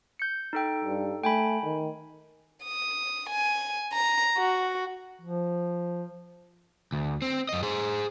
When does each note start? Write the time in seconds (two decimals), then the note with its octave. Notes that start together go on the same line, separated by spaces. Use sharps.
0.19 G6 C#7
0.53 D#4 A4 G5
0.85 G2
1.24 A3 G5 G#5 B5
1.64 D#3
2.63 D#6
3.30 G#5
3.93 A#5
4.37 F#4
5.22 F3
6.92 D2
7.22 C4
7.49 F#2 D#5
7.63 G#4 C5